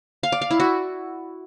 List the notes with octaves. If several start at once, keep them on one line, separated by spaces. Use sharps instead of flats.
F5
D5
F5
E4
F#4